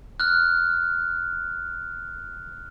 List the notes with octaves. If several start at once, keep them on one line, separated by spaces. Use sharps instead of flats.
F6 F#6